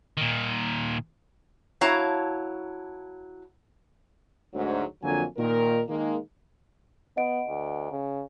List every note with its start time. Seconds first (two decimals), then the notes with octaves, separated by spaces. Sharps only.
0.17 A#2 D#3
1.81 F#3 E4 C#5 F5 A5 A#5
4.54 D2 G#2 F#3
5.03 F2 D3 F#3 A#3 F4 G#5
5.37 A#2 D#3 A#4
5.88 D#3 G#3 A#3
7.17 B3 D#5 F#5 D7
7.48 D2
7.91 C#3